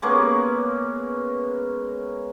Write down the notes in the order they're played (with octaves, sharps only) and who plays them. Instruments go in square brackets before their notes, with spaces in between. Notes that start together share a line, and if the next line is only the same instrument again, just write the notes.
[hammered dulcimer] G#3 A#3 B3 C#4